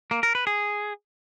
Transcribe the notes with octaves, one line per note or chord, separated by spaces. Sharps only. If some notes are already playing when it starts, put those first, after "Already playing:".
A#3
A#4
B4
G#4